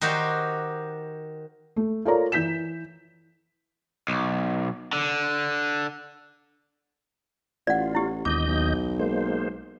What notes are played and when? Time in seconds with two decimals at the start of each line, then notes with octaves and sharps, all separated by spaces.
0.01 D#3 D#4 F#4 G4 C5
1.76 A3
2.05 F4 A4 A#4 C#5 D5 A#5
2.32 E3 G6 B6 E7
4.08 B1
4.93 D3
7.67 A1 F4 D5 F#5
7.95 E4 G4
8.25 E1 D#2 D#5 D6 G6
8.48 B1
8.99 G#3 A#3 C5